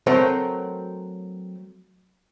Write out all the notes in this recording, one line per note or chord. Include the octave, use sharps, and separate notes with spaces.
F#3 A3 C4 A#4 C5 C#5